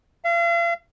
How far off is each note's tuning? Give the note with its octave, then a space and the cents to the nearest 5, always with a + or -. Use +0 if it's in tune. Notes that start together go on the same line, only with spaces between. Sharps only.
F5 -40